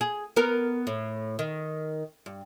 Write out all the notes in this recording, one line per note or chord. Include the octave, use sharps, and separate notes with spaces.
G#4
B3 A#4
A2
D#3
G2